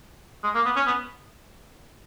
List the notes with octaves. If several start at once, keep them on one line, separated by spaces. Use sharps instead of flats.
G#3
A#3
B3
C#4
B3